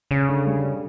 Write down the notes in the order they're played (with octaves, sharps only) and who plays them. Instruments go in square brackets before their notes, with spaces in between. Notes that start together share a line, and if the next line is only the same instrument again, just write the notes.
[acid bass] C#3 [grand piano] C#4
[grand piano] D3
G3
D3